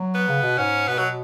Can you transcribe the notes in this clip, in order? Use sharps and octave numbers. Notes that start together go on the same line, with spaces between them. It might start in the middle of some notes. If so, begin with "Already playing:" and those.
Already playing: F#3
B3
C#3
B2
G#2 C#4
B2 B3
F#3